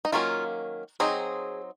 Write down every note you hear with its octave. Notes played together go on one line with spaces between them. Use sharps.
D#4
D#3 F#3 A#3 C#4 F4
F#3 C4 D#4 G#4